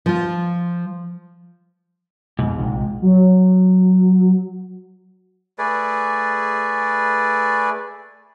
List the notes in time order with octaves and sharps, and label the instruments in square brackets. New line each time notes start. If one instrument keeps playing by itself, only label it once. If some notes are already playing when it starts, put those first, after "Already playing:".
[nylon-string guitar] F3 F4
[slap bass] F2 B2 [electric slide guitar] G#2
[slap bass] A#1 C3 F3
[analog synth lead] F#3
[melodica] A3 G#4 B4 D5